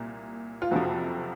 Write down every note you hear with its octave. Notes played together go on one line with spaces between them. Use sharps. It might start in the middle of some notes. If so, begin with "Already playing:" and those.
Already playing: C2 A#2
F4
F#1 F2 C3 F3 F#4